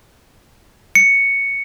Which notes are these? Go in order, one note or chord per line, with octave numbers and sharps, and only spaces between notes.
C#7